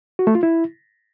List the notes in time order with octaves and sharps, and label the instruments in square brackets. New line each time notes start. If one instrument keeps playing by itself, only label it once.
[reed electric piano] F#4
A3
F4
E4